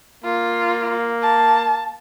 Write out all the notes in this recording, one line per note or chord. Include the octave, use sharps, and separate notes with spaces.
A#3 F4
A5